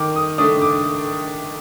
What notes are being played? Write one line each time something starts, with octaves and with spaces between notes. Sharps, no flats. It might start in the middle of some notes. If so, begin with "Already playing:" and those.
Already playing: D#3 D6
D#6
A3 D4 D#6
D6